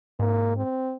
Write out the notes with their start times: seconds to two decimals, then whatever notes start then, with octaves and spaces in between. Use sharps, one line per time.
0.19 G#2 A#3
0.56 C4